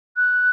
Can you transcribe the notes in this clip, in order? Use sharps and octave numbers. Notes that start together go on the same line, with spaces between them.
F#6